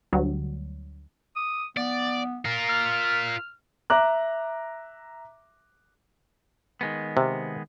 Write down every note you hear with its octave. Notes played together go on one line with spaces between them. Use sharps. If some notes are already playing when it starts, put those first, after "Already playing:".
D2 F#3 G3
D#6
B3 D5
F4 A#4
F6
E5 A#5 D6 F#6
D#3 G#3 B3
C3